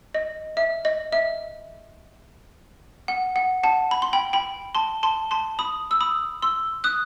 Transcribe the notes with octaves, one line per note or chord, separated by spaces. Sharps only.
D#5
E5
D#5
E5
F#5
F#5
F#5 A5
B5
C6
G5 B5
G5 B5
A5 C6
A5 C6
A5 C6
B5 D#6
E6
B5 D#6
C6 E6
D#6 F#6